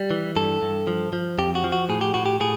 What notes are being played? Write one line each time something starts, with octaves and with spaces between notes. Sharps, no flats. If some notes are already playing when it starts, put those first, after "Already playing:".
Already playing: G3
E3
G2 A4
G2
F3
F3
F2 G4
F#4
F3
F#4
A2 G#4
G4
A2 F#4
G4
A2 G#4